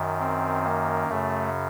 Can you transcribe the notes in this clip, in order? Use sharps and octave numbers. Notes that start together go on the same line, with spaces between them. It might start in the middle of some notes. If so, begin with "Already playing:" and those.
Already playing: F#2 D#3
C4
A#3
F#2 C#3 A3